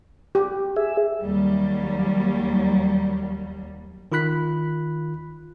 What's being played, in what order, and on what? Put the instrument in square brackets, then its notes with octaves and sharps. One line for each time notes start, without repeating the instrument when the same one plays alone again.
[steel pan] G4
[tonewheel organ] G#4 E5
[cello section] D#2 F#3 G3
[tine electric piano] D#3 F4 B5 F#6 B6